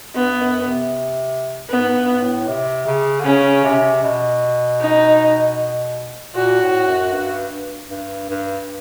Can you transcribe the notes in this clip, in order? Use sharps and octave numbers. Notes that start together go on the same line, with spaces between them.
G2 B3
F#2
C3
G#2 B3
G2
A2
C3
C#3
D3
C#3 C#4
C3
B2
D#4
A#2 F#4
A2
F#2
G2
G2
G2